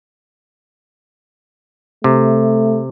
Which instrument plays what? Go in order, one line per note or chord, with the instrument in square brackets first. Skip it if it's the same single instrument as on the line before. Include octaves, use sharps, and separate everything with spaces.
[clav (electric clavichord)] C3 [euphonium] A3